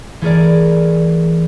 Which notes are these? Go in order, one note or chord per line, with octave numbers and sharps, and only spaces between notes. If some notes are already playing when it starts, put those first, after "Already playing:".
E3 A3 G#4 A#4 D5